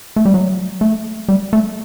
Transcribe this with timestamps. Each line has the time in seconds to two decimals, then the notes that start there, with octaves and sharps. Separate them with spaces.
0.16 A3
0.25 G3
0.34 F#3
0.81 A3
1.29 G3
1.53 A3